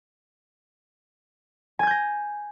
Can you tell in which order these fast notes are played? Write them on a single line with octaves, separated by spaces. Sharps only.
G#5 G#6 G6 A#6